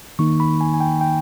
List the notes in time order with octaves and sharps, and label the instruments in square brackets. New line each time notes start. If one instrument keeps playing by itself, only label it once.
[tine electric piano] D#3 A#3 D#4 C#6
B5
G#5
G#5
G5
G5